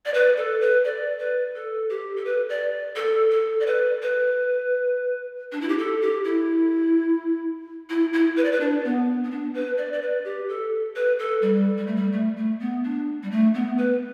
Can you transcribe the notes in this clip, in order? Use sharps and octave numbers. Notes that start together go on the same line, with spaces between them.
D5
B4
A4
B4
D5
B4
A4
G4
A4
B4
D5
A4
A4
D5
B4
B4
D4
E4
G4
A4
G4
E4
E4
E4
B4
D5
B4
D4
B3
B3
D4
B4
D5
D5
B4
G4
A4
B4
A4
G3
G3
A3
G3
A3
A3
B3
D4
G3
A3
B3
B4